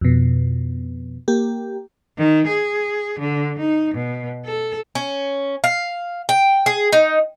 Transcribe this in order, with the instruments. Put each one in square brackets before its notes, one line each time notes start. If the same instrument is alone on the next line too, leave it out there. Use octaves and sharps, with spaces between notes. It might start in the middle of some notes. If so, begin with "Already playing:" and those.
[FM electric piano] F2 B2
A#3 G4
[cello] D#3
G#4
D3
D#4
B2
A4
[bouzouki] C#4
F5
G5
G#4
D#4